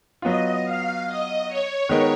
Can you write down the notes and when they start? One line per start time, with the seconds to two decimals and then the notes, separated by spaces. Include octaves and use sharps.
0.22 F#3 B3 F4 D#5
0.65 F5
1.07 D#5
1.48 C#5
1.89 D#3 G#3 B3 D#4 A#4